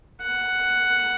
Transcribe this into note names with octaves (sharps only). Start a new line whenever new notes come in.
F#5